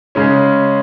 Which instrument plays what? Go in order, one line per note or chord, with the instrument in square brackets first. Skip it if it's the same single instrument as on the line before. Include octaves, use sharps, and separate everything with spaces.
[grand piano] C#3 G#3 C#4